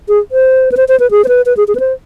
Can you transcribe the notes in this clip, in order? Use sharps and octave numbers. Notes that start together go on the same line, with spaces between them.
G#4
C5
B4
C5
C5
B4
G#4
C5
B4
B4
G#4
G#4
B4
C5